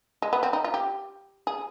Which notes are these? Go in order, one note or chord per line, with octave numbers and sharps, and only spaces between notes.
G#3
B3
C4
D#4
F4
G4
G#4